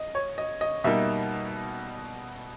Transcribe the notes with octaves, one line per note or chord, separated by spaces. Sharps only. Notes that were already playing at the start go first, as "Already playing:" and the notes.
Already playing: D#5
C#5
D#5
D#5
B2 G3 A#3 D#4 E5